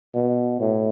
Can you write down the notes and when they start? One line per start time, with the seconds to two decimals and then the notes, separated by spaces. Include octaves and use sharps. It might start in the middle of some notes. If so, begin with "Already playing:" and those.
0.15 B2
0.60 A2